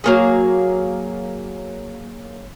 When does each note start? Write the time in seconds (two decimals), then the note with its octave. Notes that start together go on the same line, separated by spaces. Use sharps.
0.04 F#3 A#3 G#4